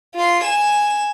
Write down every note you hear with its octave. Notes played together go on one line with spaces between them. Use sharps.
F4 C6
G#5 E7